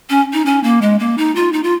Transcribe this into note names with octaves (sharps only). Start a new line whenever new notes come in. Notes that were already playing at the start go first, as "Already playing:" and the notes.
C#4
D#4
C#4
A#3
G#3
A#3
D#4
F4
D#4
F4